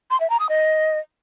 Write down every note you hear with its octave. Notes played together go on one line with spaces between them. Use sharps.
C6
E5
A#5
D#6
D#5